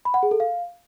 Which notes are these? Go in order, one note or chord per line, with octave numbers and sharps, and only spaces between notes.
B5
F#5
G#4
A4
F5